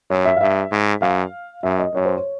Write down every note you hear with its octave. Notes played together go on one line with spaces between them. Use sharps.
F#2 C#5
E5
F5
G2 E5
G#2
F#2 F5
F#2 E5
D#5
F#2 C#5
C5
C#5